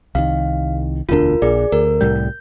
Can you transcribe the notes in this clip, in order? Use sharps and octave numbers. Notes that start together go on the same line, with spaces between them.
C2 D#3 F5
E1 D2 D4 F4 A#4
A#1 G#4 D5
D2 A#4
C2 A2 G3 G6